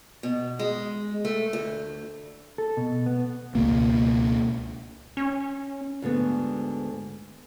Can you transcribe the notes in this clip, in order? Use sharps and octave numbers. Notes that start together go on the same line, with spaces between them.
B2
G#3
A3
D2
A4
B2
B3
C#2 B2 A#3
C#4
D2 G#2 D3 B3